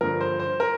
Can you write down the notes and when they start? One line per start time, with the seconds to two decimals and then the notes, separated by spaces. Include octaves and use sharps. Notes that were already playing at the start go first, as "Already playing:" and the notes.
0.01 G2 D3 F3 A#4
0.21 C5
0.40 C5
0.60 A#4